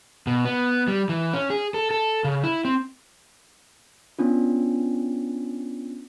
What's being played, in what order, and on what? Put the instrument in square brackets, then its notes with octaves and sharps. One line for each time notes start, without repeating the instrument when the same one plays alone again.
[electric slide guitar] B2
B3
G3
E3
C#4
G#4
A4
A4
C#3
E4
C4
[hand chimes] B3 C#4 D4 F4